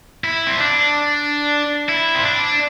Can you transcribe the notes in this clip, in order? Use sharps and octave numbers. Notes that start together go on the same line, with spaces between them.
E4
C4
D4
E4
C4
D4